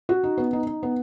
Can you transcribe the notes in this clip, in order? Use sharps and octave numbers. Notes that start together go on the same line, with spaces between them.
F#4
D#4
B3
D#4
D#4
B3